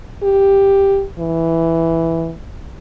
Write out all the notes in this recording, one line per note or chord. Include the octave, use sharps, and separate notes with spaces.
G4
E3